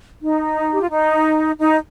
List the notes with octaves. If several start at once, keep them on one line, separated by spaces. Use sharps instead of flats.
D#4
G4
F4
D#4
D#4